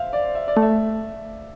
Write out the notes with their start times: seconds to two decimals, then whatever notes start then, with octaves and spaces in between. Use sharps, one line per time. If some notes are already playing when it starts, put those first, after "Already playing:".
Already playing: C5 E5 F5
0.13 D5
0.35 E5
0.48 D5
0.57 A3
0.62 E5